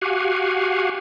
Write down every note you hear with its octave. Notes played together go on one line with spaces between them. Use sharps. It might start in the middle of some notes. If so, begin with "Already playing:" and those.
F#4 G4 F5 F#5 G#5